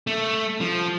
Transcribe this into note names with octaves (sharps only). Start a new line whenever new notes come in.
A3
F3